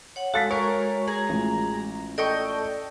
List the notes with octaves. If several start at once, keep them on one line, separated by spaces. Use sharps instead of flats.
C#5 F#5
G#3 F#4 A4 F5 A6 B6
A#4 C#5 C#6
G#4 A#5
A1 F4
A4 D5 D#5 G5 C#6